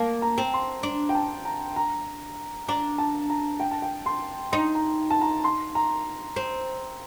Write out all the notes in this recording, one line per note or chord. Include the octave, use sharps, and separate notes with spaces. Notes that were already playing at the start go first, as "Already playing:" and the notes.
Already playing: A#3 A5
A#5
C4
C6
D4
G5
A5
A#5
A#5
D4 A#5
A5
A#5
G5
A5
G5
C6
D#4 C6
A#5
A5
A#5
C6
A#5
C4